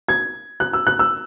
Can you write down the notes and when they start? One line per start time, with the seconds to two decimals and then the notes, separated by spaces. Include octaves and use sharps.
0.08 G#6
0.60 F#6
0.73 E6
0.87 F#6
0.99 E6